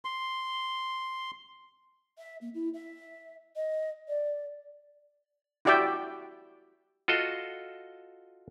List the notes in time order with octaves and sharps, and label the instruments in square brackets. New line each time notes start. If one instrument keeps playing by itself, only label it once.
[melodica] C6
[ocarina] E5
A#3
E4
E5
D#5
D5
[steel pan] E4 F#4 G4 D5 E5 G5
[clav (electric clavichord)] F4 F#4 A4 D#5